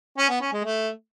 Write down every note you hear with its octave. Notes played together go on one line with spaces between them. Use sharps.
C#4
B3
C#4
G#3
A3